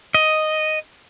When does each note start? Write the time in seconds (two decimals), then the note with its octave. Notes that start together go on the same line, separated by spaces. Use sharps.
0.14 D#5